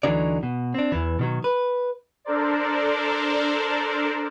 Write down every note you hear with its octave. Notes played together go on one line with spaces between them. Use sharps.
D2 D3 E3 F#3 D#4 D5
B2
C4 D4
E2 E3
B2 D#3 F#3
B4
D4 A4 A#4 C5 D5